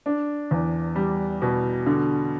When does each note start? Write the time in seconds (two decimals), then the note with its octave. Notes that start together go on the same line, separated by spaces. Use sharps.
0.06 D4
0.51 E2
0.96 G3
1.42 B2
1.86 D3